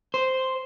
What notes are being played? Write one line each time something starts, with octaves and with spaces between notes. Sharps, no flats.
C5